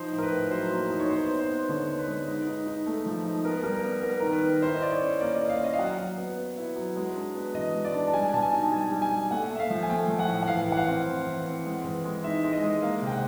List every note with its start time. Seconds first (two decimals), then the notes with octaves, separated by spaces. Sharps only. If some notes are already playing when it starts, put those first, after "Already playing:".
Already playing: F3 D#4 C5
0.12 A2
0.18 A#4
0.22 B4
0.31 A2
0.51 F#3 C5
0.71 A#3
0.90 D#4
1.00 C#5
1.10 B3 C5
1.29 B3
1.40 C5
1.50 B3
1.69 D3 C#5
1.89 B3
1.98 B4
2.07 G#3
2.27 D#4
2.47 D#4
2.66 D#4
2.86 A3
3.06 F3
3.24 D#4
3.44 B3 A#4
3.63 G3 A#4
3.74 A#4
3.84 B3
4.03 B3 A#4
4.20 D#3 A#4
4.32 B4
4.42 D#3
4.62 E4 C5
4.75 D#5
4.81 E4 D5
4.90 C#5
5.01 C#4
5.20 A#3 D5
5.35 A#3 D#5
5.49 F5
5.59 C#4 D#5
5.73 F5
5.78 F#3 F#5
5.98 F#3
6.17 B3
6.38 B3
6.57 E4
6.76 F#3
6.96 G#3
7.16 D4
7.35 B3
7.54 E3 D#5
7.74 G#3
7.84 D5
7.94 D4
8.07 A5
8.13 G3 G#5
8.33 B2 A5
8.42 G#5
8.52 D#4
8.63 A5
8.71 G3 G#5
8.92 G3
9.02 G#5
9.11 G3
9.31 A3 F#5
9.50 A3 E5
9.60 F5
9.70 F3
9.83 G#5
9.90 A3 G5
10.08 F3
10.19 F#5
10.28 A2
10.43 F#5
10.47 E3 F5
10.68 E3 F#5
10.77 F5
10.87 C4
11.06 E3
11.27 E3
11.45 C4
11.66 G#3
11.84 E3
12.05 G#3
12.24 D#4 E5
12.44 G#3
12.53 D#5
12.63 G#3
12.82 A#3 F5
13.02 C3
13.07 G5
13.12 F#5